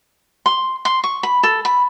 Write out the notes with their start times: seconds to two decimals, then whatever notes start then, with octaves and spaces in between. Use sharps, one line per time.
0.46 C6
0.85 C6
1.04 C#6
1.23 B5
1.43 A4
1.65 B5